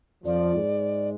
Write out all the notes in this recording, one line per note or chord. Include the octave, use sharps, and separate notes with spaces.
F2 F3 D5
G#2 G#3